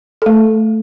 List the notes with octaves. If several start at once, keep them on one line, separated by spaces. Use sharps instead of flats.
A3 A4